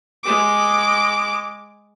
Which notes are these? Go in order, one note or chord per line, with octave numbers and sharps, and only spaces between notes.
G#3 D6